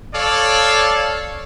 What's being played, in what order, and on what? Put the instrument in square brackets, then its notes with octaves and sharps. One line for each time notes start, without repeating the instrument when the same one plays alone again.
[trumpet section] A4 C#5 D5 F5